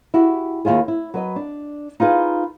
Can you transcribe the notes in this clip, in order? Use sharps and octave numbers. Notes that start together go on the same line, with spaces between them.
E4 F#4 G4
D#2 C#3 E4 F4 G#4
E4
F#3 B4 D#5
D4
D#4 F4 G#4 B4